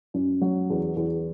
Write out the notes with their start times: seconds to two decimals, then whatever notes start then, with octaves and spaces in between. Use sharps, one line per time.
0.14 F#2
0.41 F#3
0.70 E2
0.96 E2